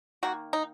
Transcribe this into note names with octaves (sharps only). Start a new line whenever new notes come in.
D#3 A#3 F#4
D#4